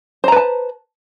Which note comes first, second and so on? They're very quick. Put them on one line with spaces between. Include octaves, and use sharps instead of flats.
C5 A#5 B4 A5